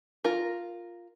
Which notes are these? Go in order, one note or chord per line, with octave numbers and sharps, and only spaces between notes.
F4 A#4